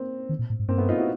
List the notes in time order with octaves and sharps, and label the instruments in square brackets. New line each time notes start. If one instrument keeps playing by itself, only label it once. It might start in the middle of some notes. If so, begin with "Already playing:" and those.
Already playing: [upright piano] A#3 C4
[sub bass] D#3
A#2
A2
G#2
[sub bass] G2 [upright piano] A#3 C4
[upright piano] A3 B3
D#4 F4
E4 F#4